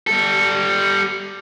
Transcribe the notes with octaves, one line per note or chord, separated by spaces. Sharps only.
G3 A4